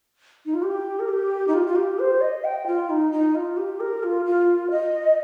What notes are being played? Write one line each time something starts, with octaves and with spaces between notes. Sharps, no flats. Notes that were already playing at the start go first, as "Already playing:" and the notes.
D#4
F4
G4
A#4
G4
D#4
F4
F4
G4
C5
D#5
G5
F4
D#4
D#4
F4
G4
A#4
F4
F4
D#5